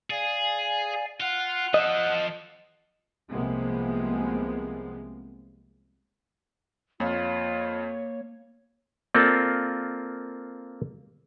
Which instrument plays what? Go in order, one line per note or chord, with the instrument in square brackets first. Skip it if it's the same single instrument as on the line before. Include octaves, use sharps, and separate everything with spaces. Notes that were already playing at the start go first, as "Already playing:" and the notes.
[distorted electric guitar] G#4 [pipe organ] D5 F5 G#5
[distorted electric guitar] F4 [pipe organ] F#5 F#6
[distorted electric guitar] F3 A4 [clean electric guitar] D#5
[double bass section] C2 C3 F3 G#3 A#3 B3
[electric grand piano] F2 [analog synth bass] A#3 [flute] F4 [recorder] C#5
[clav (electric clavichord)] A#3 C4 F4 A4 D5